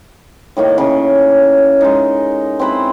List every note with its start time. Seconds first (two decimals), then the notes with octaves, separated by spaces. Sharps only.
0.57 A2 D#3 A#3
0.78 C#3
1.81 G#3 D#4
2.59 C4 E4 B4 C5